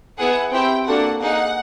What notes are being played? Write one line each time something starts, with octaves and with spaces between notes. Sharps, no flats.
B3 E4 G#4 F#5
C4 E4 G4 G5
A#3 D4 F#4 A4 F#5
A#3 D#4 G#4 F#5